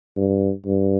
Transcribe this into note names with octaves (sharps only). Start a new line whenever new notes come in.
G2
G2